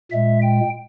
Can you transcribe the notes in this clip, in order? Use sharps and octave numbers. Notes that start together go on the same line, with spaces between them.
A#2 G#3 E5
G5